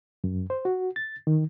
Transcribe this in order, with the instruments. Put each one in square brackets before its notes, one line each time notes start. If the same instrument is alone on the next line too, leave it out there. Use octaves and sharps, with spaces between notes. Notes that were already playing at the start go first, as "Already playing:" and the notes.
[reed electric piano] F#2
C5
F#4
A6
D#3